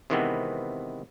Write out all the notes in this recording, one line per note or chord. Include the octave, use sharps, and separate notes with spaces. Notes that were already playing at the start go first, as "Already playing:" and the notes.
C3 D#3 E3 G#3 B3 C4